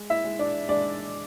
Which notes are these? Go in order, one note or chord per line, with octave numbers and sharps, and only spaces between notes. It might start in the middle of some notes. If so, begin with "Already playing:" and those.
Already playing: G#3
E4 E5
G#3
D4 D5
G#3 D4 D5